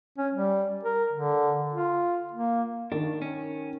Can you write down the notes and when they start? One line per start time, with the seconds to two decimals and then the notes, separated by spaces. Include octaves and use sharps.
0.18 C#4
0.34 G3
0.83 A#4
1.13 D3
1.73 F4
2.32 A#3
2.92 D#3 D4
3.22 C#4